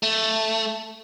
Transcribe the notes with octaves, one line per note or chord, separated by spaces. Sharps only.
A3